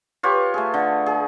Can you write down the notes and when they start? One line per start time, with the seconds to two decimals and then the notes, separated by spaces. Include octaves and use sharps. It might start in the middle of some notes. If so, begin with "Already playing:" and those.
0.23 F4 G4 B4 C#5
0.54 A3 G#4
0.74 D3
1.06 G#4